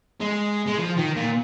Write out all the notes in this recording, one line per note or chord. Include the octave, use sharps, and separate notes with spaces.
G#3
G#3
F3
D#3
A#2